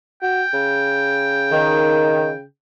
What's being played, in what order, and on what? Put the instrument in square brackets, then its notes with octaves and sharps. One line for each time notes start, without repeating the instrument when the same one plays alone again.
[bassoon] F#4 [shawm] G5
[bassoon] C#3
[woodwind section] D#3